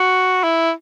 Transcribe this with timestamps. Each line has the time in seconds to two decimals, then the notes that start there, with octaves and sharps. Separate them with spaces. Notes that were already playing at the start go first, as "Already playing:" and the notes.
Already playing: F#4
0.43 E4